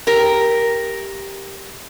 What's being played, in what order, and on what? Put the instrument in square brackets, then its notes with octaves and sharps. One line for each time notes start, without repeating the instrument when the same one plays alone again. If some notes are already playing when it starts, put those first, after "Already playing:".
[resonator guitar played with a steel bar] G4 A#4